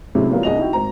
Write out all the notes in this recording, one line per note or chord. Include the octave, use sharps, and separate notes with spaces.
A2 C3 F#3 G#3 C#4 E4
E3 F#3 G3 B3 F4 A#4
C2 D4 G#4 D#5 F#5 F7
D#4 E4 F#4 G5
G#1 C5 A#5